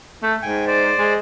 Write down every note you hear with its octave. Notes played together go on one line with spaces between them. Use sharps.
A3
G#2 G5 G#5
C5 D5
G#3